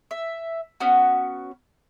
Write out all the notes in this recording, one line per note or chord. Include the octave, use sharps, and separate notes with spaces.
E5
B3 C#4 F#4